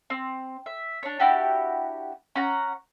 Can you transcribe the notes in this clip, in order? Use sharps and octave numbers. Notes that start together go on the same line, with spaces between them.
C4
E5
D4 C#5
D4 E4 F#4 G4
C#4 F#5 A#5